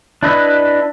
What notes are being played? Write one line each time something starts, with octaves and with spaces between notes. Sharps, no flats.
D4 E4 B4 D#5 E5